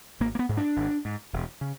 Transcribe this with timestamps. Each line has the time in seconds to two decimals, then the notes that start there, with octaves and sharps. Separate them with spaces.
0.20 G#1 A#3
0.35 A#3
0.39 B3
0.49 G#2
0.57 D4
0.76 G#1
1.05 G#2
1.33 E1
1.61 C#3